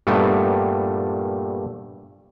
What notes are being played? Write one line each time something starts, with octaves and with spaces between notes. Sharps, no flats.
G2 A#2 G3 A3 B3